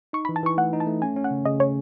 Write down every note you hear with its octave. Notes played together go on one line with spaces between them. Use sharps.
D#4 C#6
B5
E3
A5
E3 C#6
A3 F#5
D#4
A5
A3
C#4 G#5
C#4
F#5
C#3
C#3 D#5
C#4 C#5